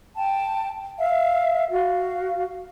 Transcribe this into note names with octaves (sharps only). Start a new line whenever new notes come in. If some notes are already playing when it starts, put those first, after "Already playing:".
G5 A5
E5 F5
F#4 F5